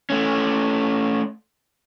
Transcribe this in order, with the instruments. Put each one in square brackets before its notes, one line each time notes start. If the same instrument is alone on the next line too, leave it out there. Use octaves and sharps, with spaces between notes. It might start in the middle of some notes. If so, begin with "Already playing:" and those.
[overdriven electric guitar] A3 C#4